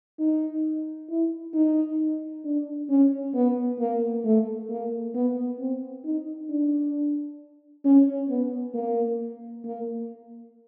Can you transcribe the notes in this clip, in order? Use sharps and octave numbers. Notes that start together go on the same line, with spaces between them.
D#4
E4
D#4
D4
C#4
B3
A#3
A3
A#3
B3
C4
D#4
D4
C#4
B3
A#3
A#3